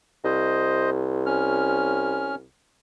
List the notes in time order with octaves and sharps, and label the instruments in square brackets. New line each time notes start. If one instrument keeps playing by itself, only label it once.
[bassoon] C2 [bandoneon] C5 D#5
[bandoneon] C#4 F6